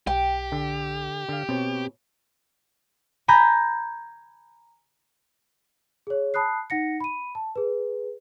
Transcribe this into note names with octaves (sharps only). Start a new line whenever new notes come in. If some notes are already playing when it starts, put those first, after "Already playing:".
B1 G4 G5
D3
D3 F5
B2 C4 C#5
G#5 A#5 B5 G6
G#4 C#5
A5 B5 D#6 F#6 C7
D#4 F#5 A#6 C#7
B5 D#7
A5
G#4 B4